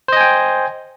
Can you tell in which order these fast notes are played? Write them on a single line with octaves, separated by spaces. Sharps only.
C5 D#5 G#5 G5